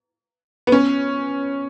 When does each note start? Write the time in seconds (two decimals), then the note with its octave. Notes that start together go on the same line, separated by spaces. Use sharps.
0.67 B3
0.72 C#4